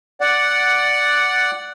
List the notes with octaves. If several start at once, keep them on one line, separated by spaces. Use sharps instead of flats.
D5 F#5